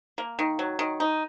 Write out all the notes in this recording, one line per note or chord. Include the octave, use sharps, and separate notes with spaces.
A#3
D#3
F#3
D#3
D#4